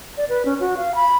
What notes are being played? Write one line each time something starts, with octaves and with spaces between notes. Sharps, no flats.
D5
B4
C#4
F#4
F5
B5